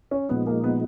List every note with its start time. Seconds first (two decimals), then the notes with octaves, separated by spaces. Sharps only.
0.11 C#4
0.29 A#2 F3 G#3 B3 D#4
0.46 A#3
0.64 B3